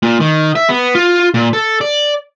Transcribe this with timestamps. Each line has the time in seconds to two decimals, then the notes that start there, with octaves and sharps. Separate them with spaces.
0.03 A#2
0.20 D#3
0.55 E5
0.69 B3
0.95 F4
1.34 A#2
1.53 A4
1.81 D5